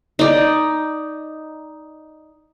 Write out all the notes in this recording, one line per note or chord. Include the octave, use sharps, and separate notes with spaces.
D#4 D5